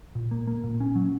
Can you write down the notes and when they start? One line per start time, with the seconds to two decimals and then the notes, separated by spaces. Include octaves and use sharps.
0.15 A#2
0.31 A#3
0.47 A#3
0.64 A#2
0.80 C#4
0.96 F#3